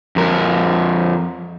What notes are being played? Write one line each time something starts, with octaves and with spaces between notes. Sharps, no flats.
F2 A#4